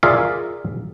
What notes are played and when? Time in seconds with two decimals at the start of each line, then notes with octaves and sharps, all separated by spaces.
0.03 F4 G#4 A#4 D5 E5 F5